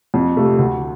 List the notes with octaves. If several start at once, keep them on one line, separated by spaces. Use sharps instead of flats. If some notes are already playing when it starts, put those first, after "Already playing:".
F2
C3 F3 A3
D2